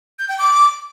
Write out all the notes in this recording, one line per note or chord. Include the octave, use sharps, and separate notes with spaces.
G6
G5
D6